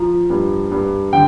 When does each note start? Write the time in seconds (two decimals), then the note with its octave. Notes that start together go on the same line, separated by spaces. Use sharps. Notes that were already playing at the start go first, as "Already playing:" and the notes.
Already playing: F3 A#5
0.30 G2
0.72 G2
1.13 D3 G5